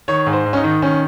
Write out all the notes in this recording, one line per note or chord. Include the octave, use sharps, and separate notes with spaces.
D#3 C#5
G#2
C5
G#2
C#4
D#4
D#3
D#3 C#4